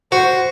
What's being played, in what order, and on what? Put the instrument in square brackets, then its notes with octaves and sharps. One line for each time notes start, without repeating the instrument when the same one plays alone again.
[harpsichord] F#4 [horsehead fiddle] C5